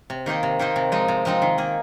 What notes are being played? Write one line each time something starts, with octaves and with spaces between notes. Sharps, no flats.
C3
D#3 A#3 D#4 C5
C3
D#3 A#3 D#4 C5
C3
F3 G#3 C4 D#4
C3
F3 G#3 C4 D#4
D#3
A#3 G#4